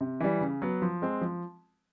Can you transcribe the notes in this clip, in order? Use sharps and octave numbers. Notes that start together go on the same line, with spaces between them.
C3
E3 G3
C#3
F#3 B3
F3
G#3 C4
F3